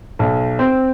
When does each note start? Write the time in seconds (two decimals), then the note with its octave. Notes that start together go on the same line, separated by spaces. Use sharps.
0.19 B1
0.59 C4